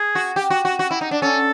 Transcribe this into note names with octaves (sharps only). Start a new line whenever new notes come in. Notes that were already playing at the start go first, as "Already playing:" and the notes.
Already playing: G#4
F#4
G4
F#4
F#4
F#4
E4
D#4
D4
C#4 A4